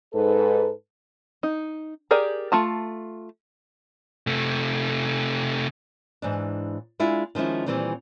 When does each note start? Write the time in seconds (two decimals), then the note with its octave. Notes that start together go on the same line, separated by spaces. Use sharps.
0.14 G#2 A4 B4
1.43 D#4
2.11 G4 G#4 A#4 D5 G#5
2.52 A3 F4 A5
4.27 C3 A3
6.22 G#2 E3 D4
6.99 G#3 D4 E4 F4
7.35 D#3 F3 G#3 C#4 E4
7.66 A#2 D#3 E3 G3 C4